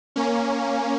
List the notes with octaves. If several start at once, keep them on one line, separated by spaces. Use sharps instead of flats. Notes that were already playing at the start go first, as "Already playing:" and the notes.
A#3 C#4